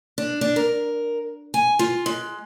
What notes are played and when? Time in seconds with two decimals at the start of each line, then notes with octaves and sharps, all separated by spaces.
0.18 D4
0.41 D4
0.56 A#4
1.54 G#5
1.79 F4
2.06 G#3